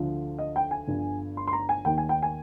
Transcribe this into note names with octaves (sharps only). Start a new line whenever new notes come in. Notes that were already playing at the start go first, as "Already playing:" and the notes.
Already playing: D2 D3 F3
D#5
G5
G#5
G1 G2 D3 F3
C6
C6
A#5
G#5
D#2 D#3 G5
G#5
G5
G#5